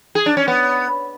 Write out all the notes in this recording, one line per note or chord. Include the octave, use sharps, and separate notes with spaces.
G#4
D4
C#4
B3